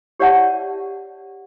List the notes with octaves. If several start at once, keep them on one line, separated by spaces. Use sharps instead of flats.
G4 C#5 D5 E5 F#5 A5